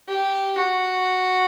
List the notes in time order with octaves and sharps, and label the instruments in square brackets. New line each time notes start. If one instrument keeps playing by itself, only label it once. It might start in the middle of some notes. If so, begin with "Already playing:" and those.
[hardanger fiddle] G4
F#4